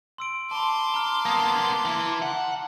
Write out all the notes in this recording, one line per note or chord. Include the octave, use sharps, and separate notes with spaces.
C6 E6 D7
A5 B5 C6 D6
A#5 F6
A#3 B3 A5 D#6
E3 E4
F#5